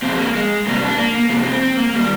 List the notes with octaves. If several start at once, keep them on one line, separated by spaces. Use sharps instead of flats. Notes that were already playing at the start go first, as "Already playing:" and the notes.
A#2 F3 G#3 C4
A#3
G#3
F2 C3 G3 A#3
D4
A#3
A#3
C3 F3 G#3 A#3
C4
C4
A#3
D#3 G3 A#3